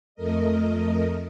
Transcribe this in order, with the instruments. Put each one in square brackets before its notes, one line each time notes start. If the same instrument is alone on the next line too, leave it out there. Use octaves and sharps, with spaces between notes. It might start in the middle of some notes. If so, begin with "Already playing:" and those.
[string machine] F2 A3 A#4 D#5